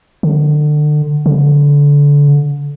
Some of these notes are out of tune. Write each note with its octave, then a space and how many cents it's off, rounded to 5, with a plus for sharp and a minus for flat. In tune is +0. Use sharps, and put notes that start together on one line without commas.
D3 +30
D3 -25